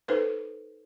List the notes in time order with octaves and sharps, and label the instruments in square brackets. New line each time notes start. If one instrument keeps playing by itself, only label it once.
[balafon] D#4 A4 B4 C5